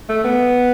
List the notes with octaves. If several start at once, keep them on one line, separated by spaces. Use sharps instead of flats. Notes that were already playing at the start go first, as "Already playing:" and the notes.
A3
B3